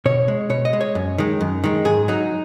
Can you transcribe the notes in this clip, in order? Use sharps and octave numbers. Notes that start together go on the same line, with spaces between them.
B2 C#5
G#3
B2 C#5
D#5
G#3
C#5
F#2
D#3 G#3
F#2
D#3 G#3
G#2 G#4
F#3 D#4